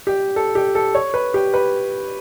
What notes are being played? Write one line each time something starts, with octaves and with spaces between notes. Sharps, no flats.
G4
A4
G4
A4
C#5
B4
G4
B4